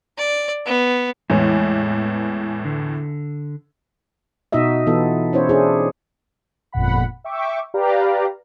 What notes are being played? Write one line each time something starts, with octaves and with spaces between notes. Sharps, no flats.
D5
B3
E2 A2 E3 G#3 C#5
D3
B2 D#4 F#4 D#5 E5
E3 B3 E4 F4 A4
C#4 E4 C5 C#5
D4 E4 G#4 C5
G1 F2 A#2 F#5 B5
E5 G5 C#6 D6
G4 B4 D5 F5 A#5